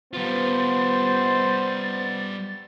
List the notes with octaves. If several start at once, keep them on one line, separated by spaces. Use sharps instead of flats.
G3 B3 F4 C5 A6